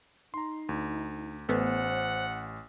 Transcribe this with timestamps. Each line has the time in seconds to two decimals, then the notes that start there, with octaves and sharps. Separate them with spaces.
0.34 D#4 A#5 C6
0.69 D2
1.49 A1 A3 B3 C5 F#5